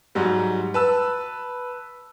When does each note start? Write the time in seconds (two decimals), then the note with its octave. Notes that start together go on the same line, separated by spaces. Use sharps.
0.15 G#2 F#3 G3
0.74 B4 A5 E6